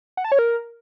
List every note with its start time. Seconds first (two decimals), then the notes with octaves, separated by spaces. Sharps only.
0.17 F#5
0.24 A5
0.32 C#5
0.39 A#4